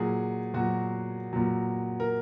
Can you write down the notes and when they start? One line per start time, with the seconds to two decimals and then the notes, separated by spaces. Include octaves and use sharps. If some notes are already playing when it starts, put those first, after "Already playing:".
Already playing: A#2 F#3 G#4
0.54 A#2 F#3 F#4
1.33 A#2 F#3
2.00 A#4